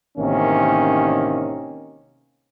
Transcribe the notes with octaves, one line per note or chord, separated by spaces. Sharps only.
A1 C3 D#3 A#3 C#4